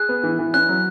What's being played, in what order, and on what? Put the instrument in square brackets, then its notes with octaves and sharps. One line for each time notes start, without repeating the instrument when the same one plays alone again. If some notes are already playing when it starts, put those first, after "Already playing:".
Already playing: [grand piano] G#4 [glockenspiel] F#6
[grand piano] B3
E3
E3
[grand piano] C#4 [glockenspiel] F#6
[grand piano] F#3